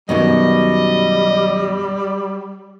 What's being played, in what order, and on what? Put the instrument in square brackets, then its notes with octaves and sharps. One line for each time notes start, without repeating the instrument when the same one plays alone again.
[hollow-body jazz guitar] F#2 B2 D#3 [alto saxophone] G3 [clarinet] D#5